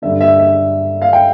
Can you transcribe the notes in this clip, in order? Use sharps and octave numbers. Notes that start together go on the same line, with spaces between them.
G2 D3 E5
E5
E5
F5
G5